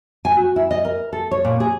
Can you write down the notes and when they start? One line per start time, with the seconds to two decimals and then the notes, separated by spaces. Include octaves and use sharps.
0.25 G#5
0.37 F#4
0.56 E4
0.71 D#5
0.85 A#4
1.13 A4
1.31 C#5
1.45 A#2
1.60 G#4